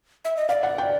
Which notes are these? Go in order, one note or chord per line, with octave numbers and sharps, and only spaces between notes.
E5
D#5
D5 F5
F#5
G5